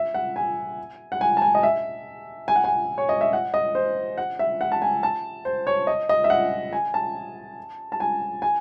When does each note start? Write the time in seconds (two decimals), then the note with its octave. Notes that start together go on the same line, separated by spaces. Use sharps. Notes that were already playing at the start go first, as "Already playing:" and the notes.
Already playing: E5
0.14 F#5
0.36 G#5
1.12 F#5
1.21 G#5
1.37 A5
1.42 G#5
1.55 D#5
1.63 E5
2.48 G#5
2.56 F#5
2.64 G#5
2.98 C#5
3.09 D#5
3.21 E5
3.33 F#5
3.54 D#5
3.75 C5
4.18 F#5
4.39 E5
4.61 F#5
4.72 A5
4.82 G#5
5.03 A5
5.45 C5
5.67 C#5
5.87 D#5
6.09 D#5
6.24 E5
6.30 F#5
6.73 G#5
6.94 A5
7.92 A5
8.00 G#5
8.42 G#5